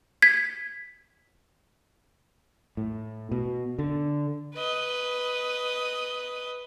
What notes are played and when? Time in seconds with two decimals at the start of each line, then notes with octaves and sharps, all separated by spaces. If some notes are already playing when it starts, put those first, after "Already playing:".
0.22 G#6 B6
2.77 A2
3.32 B2
3.79 D3
4.55 B4 D#5